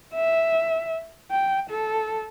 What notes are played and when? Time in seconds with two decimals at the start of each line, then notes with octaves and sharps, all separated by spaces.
0.14 E5
1.31 G5
1.70 A4